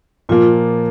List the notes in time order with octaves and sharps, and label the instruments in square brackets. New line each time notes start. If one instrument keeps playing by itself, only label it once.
[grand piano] A#2 F3 A#3 [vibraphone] F4